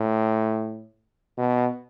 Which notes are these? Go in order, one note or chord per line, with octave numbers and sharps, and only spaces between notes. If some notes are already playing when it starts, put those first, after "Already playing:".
Already playing: A2
B2